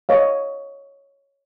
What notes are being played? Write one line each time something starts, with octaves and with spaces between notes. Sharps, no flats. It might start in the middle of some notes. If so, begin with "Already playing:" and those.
C#5 D#5 F5